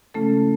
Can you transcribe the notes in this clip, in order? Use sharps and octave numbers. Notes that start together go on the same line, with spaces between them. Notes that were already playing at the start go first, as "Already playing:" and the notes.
C#3 F3 G#3 A3 C#4 E4 A4